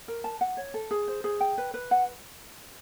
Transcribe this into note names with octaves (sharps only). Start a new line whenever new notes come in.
A#4
A5
F#5
C#5
A4
G#4
C5
G#4
G5
B4
B4
F#5